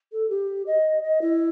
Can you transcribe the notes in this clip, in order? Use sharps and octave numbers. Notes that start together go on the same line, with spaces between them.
A4
G4
D#5
D#5
E4